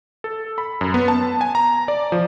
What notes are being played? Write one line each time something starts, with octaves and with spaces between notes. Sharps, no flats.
A4
B5
F#2
B3
A5
G#5
A#5
D5
F3